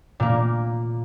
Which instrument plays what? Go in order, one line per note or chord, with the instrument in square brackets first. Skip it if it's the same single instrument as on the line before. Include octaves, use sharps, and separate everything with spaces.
[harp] A#2 A#3